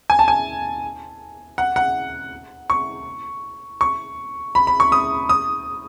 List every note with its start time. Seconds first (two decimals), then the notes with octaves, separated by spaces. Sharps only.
0.10 G#5
0.19 A5
0.28 G#5
1.58 F#5
1.76 F#5
2.70 C#6
3.81 C#6
4.55 B5
4.67 B5
4.80 C#6
4.92 D#6
5.29 D#6